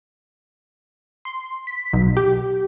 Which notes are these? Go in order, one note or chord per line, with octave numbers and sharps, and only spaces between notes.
C6
B6
B1
G4